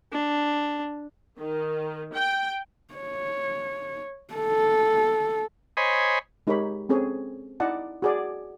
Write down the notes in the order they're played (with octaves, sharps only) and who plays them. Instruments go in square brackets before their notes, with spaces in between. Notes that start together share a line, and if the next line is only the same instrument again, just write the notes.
[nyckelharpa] D4
[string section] D#3
G5
[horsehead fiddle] C#5
A4
[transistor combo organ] C5 C#5 D#5 G#5 B5
[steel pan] G#3 D#4 G4 A#4 C#5 B5
C4 C#4 G#4 A4 C#5
D#4 E4 D5 D#5 F#5 A5
F#4 G#4 D5